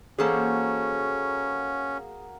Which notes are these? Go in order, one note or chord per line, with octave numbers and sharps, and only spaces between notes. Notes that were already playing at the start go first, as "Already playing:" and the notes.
E3 A#3 C#4 F#4 G#4 A4 C5